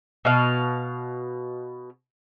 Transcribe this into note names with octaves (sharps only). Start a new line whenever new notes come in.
B2 F5